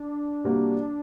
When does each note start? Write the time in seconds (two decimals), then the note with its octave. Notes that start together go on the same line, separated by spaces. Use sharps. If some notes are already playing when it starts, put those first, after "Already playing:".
Already playing: D4
0.44 C3 G3 A#3 F#4